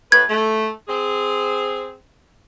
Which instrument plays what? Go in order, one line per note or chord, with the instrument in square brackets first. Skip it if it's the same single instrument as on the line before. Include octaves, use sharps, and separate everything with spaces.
[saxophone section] A2 B4 [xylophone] G#6
[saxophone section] A3
C4 G#4